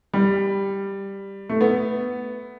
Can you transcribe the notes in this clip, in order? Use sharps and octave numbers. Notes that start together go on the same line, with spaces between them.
G3
A3
B3